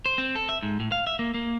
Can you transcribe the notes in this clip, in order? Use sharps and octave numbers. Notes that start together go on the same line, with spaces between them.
C5
C4
A4
E5
G#2
A2
F5
E5
A#3
A#3